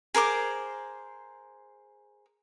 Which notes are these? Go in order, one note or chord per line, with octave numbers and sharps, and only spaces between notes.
G#4 A#4 C5 D6